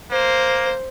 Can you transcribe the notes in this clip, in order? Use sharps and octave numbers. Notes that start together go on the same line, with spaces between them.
A#3 C5